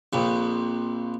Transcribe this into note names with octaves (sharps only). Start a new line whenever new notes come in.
A#1 F2